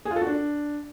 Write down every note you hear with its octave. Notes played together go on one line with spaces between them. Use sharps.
G#4
F4
A4
F#4
D4